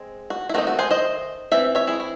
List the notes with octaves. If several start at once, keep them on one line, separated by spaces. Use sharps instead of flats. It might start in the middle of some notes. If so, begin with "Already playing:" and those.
Already playing: G#3 C4
F#4
E4
D#3 A3 C4 D#4 F#4
F#4
G#4 C5
C5 D#5
E3 C4 E5
C#5 E5
E4 G#4
E4